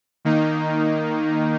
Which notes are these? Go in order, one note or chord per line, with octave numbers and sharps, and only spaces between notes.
D#3 A#3 D#4